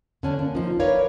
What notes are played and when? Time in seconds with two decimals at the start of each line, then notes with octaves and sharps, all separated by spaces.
0.23 D3 C#4 D4
0.39 A#3
0.55 F3 D#4
0.79 A#4 B4 C#5 D5 F5